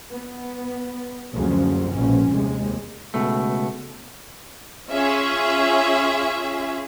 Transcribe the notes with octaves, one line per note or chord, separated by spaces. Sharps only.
B3
F#1 D2 C#3 F3 F#3
A#1 G#2 B2 F3 C#4
F1 D#2 C3 G#3
C#2 B2 A3
C#4 F4 G#4 E5